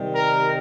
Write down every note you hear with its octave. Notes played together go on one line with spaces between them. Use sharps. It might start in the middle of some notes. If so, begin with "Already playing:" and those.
Already playing: C3 D#3 G3
A#4